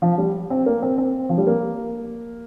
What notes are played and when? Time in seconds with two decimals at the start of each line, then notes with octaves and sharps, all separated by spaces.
0.02 F3
0.18 G3
0.50 C4
0.66 A#3
0.82 C4
0.98 C4
1.29 F3
1.38 G3
1.47 A#3